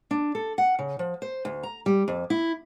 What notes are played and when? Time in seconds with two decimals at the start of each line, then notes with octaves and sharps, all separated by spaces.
0.11 D4
0.35 A4
0.58 F#5
0.79 C#3
0.99 F3
1.22 C5
1.45 D2
1.63 A#5
1.86 G3
2.08 F2
2.30 E4